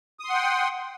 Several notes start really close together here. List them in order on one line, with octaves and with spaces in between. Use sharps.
D#6 C6 F#5 G5